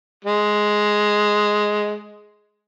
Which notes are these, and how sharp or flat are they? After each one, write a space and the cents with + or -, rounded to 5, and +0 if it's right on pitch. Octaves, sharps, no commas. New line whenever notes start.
G#3 +5